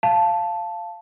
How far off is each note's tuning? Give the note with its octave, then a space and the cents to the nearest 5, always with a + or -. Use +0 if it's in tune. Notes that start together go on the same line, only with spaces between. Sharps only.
F5 -15 A5 +0